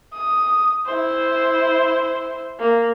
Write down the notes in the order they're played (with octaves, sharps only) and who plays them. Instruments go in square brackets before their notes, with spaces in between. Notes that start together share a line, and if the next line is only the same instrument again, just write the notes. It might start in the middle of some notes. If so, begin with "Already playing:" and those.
[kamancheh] D#6
E4 C5
A#3